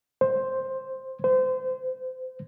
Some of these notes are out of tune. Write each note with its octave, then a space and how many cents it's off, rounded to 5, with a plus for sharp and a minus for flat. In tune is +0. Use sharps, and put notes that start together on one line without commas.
C5 +5
C5 -30